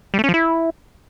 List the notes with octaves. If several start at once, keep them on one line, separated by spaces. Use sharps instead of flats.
G3
A3
C#4
F3
E4